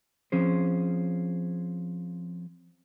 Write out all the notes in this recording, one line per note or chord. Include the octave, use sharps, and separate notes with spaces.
F3 C4 C#4 G#4 C5